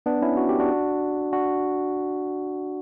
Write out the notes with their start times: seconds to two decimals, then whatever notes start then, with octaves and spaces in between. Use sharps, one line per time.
0.06 B3 D4
0.22 C#4 E4
0.37 F#4
0.49 G4
0.60 D4 F#4
1.33 D4 F#4